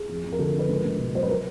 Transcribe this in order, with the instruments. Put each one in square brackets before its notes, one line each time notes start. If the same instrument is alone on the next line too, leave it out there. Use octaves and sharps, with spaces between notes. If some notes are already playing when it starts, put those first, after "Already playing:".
Already playing: [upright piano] G#4
F2
F2
A#4
D3 A4
F3 A#4
B4
C#2
C#2
B2
F#3 C5
B4
A#4